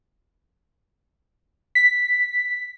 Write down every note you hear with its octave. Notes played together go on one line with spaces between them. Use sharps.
B6